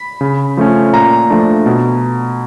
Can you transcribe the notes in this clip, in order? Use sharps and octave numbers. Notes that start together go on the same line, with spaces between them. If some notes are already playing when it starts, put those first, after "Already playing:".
Already playing: B5
C#3
F3 A3 C#4
A#2 A#5
F3 A3 D4
B2